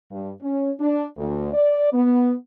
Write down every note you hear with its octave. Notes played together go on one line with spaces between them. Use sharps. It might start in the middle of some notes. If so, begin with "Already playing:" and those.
G2
C#4
D4
D2
D5
B3